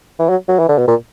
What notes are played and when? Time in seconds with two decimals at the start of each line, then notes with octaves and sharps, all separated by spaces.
0.19 E3
0.29 F#3
0.49 F#3
0.59 E3
0.69 D3
0.78 B2
0.88 A#2